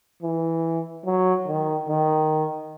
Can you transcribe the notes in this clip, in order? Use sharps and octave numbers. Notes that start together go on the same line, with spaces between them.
E3
F#3
D#3
D#3